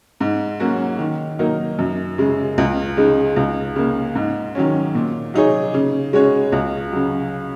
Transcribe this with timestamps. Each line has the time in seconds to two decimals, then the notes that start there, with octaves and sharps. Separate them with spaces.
0.21 G#2
0.60 F#3 A#3 C#4 F#4
0.99 D#3
1.39 F#3 A#3 D#4 A#4
1.79 F#2
2.18 C#3 G#3
2.58 C#2
2.97 C#3 G#3 D#4
3.36 C#2
3.76 C#3 A#3
4.15 G#2
4.55 D#3 F#3 C#4
4.95 A#2
5.34 F#3 D#4 G#4 C#5
5.74 C#3
6.13 G#3 C#4 F#4 C#5
6.52 C#2
6.92 C#3 F#3